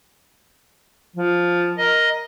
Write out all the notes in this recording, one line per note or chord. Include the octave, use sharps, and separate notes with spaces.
F3
A#4 D#5